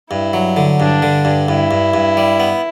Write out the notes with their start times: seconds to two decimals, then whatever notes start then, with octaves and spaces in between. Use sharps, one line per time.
0.11 G2 E4
0.33 F#3
0.57 D3
0.79 G2 D4
1.02 D3
1.25 G2
1.48 G2 E4
1.71 G2
1.94 G2
2.17 G3
2.40 B3